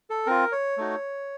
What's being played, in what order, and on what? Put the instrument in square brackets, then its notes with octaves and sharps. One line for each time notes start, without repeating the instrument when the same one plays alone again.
[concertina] A4
C4 F4 A#4
C#5
A3 D#4 F#4